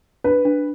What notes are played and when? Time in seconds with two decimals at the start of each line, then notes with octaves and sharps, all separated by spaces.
0.24 D4 B4
0.45 D4